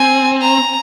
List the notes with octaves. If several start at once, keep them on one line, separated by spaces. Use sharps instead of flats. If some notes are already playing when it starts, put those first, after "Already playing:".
Already playing: C4 G#5
A#5